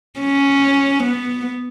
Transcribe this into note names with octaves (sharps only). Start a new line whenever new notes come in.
C#4
B3